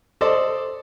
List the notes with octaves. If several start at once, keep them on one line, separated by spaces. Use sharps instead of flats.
A4 C5 D5 D#5